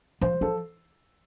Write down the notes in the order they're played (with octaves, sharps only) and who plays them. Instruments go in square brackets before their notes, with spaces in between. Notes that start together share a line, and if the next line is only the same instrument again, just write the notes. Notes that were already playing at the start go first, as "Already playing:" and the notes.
[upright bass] F3 [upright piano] C5
[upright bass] F3 [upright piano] A4